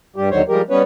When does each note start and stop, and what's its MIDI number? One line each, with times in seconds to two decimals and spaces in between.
0.16 0.29 43
0.16 0.29 55
0.16 0.29 67
0.31 0.42 39
0.31 0.42 50
0.31 0.42 51
0.31 0.42 54
0.31 0.42 72
0.31 0.42 73
0.48 0.62 53
0.48 0.62 55
0.48 0.62 56
0.48 0.62 67
0.48 0.62 70
0.70 0.82 55
0.70 0.82 59
0.70 0.82 61
0.70 0.82 71
0.70 0.82 73